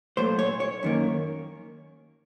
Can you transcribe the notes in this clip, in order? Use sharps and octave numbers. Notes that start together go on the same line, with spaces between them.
A#2 F#3 A3 C5
C#5
C#5
F#2 D#3 A#3